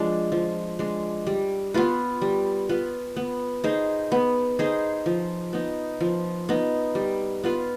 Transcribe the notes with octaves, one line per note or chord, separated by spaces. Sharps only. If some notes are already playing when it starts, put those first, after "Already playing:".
Already playing: F3 G#3 D4
F3
G#3 D4
G3
B3 F4 B4
G3
B3 F4 B4
B3
D#4 G#4 C5
B3
D#4 G#4 C5
F3
B3 D#4
F3
B3 D#4
G3
B3 F4 B4